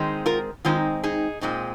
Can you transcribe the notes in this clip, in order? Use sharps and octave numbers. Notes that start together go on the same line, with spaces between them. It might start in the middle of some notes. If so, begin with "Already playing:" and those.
Already playing: D#3 G#3 C4 D#4
F4 A#4
D#3 G#3 C4 D#4 F4
D#4 G#4
A#2 G#3 C4 D#4